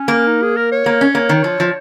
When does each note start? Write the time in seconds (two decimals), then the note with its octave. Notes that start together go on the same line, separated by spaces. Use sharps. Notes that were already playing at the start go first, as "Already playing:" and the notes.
Already playing: C#4
0.08 A#3
0.27 D#4
0.43 G#4
0.57 A#4
0.72 C#5
0.86 A#3
1.01 C#4
1.15 A#3
1.29 D#3
1.44 F3
1.60 F3